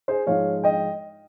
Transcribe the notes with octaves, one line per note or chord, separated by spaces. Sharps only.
G#4 C5
G#2 F3 G#3 C#5 F5
D#5 G5